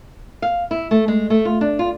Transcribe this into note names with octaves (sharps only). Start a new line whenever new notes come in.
F5
E4
A3
G#3
A3
F4
D4
F4